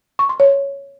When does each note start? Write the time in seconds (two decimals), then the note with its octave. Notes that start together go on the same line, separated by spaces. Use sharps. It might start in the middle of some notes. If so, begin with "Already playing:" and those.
0.19 C#6
0.29 C6
0.40 C#5